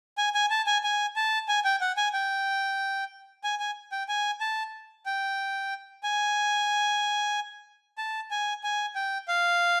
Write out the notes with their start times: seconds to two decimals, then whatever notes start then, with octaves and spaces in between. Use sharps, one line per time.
0.18 G#5
0.35 G#5
0.50 A5
0.66 G#5
0.84 G#5
1.16 A5
1.48 G#5
1.65 G5
1.81 F#5
1.97 G#5
2.13 G5
3.44 G#5
3.60 G#5
3.92 G5
4.08 G#5
4.40 A5
5.06 G5
6.03 G#5
7.98 A5
8.31 G#5
8.63 G#5
8.95 G5
9.28 F5